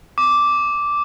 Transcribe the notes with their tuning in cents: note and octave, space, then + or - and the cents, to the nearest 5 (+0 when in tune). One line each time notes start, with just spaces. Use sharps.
D6 -5